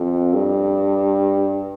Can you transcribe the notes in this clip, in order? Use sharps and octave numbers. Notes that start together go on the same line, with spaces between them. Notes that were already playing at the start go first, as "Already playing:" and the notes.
Already playing: F2
G2